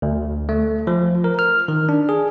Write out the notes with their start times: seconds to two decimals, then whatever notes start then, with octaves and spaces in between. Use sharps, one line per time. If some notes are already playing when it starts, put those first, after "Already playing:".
0.02 D2
0.49 A3
0.87 F3
1.24 A#4
1.39 F6
1.68 D#3
1.89 D4
2.09 G#4